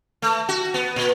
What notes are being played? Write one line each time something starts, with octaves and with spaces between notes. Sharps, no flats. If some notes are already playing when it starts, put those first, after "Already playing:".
A3
F#4
B3
A#2